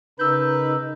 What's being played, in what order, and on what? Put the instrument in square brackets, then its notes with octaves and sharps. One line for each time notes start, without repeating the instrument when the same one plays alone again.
[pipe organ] C#3 A#4 [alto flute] D#4 [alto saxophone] B4 [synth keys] E6 G6